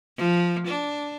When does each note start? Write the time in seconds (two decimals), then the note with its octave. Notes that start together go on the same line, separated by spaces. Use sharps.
0.18 F3
0.68 D4